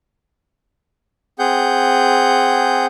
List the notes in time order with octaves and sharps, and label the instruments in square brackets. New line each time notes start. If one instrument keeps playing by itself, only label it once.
[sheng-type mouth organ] C4 G#4 F#5 G6